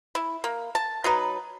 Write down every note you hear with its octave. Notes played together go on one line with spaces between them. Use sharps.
E4
A#3
A5
F#3 D#4 B4